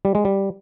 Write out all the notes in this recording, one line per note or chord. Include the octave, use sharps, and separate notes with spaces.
G3
G#3
G3